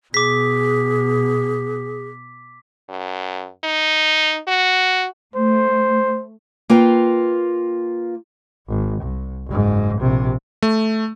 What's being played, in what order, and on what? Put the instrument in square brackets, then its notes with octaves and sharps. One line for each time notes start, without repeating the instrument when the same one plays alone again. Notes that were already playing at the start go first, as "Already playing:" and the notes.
[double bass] B2 [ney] G#4 [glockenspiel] D6 B6
[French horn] F#2
D#4
F#4
[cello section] A3 [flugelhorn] C5
[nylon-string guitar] A#3 F4 B4 G5
[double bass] G#1
C2
F#1 G#2
A#1 C3
[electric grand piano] A3